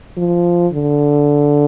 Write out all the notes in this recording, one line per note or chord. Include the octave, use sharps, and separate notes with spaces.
F3
D3